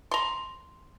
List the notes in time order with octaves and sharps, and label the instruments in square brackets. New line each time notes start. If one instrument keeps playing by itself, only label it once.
[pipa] A#5 C6